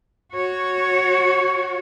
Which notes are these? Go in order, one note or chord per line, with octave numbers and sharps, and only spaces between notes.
F#4 C#5